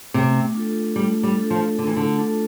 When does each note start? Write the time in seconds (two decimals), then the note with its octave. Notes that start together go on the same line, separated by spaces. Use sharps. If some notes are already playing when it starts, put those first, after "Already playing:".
0.14 C3 A3
0.55 D4 F4 A4
0.96 G3 A3
1.23 G3
1.37 D4 F4 A4
1.50 F3
1.78 D3 A3
1.87 E3
1.97 D3
2.18 D4 F4 A4